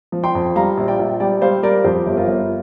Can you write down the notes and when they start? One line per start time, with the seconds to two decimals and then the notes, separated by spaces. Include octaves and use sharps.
0.12 F3
0.24 G5 C6
0.35 F2
0.56 G3 F5 A#5
0.77 A#1
0.88 D5 G5
0.99 A#1
1.20 G3 D5 G5
1.42 G3 C5 F5
1.63 G3 A#4 D5
1.84 F2 G4 C5
2.06 G1
2.17 F4 A#4
2.28 G1